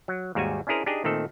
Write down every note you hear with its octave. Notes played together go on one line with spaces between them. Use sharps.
F#3
D#2 G#2 G3 F#4 G#5
C#4 D4 E4 G#4 A#4 C5
D4 D#4 G4 G#4 D#5
A#2 D#3 A3 C4 A4